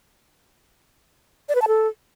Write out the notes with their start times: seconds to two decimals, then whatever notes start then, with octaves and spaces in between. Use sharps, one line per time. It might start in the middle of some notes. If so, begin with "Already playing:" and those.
1.49 D5
1.55 B4
1.62 A5
1.68 A4